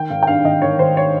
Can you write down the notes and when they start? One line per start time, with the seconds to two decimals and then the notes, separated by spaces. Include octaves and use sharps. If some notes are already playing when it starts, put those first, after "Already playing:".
Already playing: D#3 G5
0.10 G#1 F5
0.23 G5
0.27 G2 F5
0.44 G#1 D#5
0.62 D#3 C#5
0.79 G#1 C5
0.97 C#5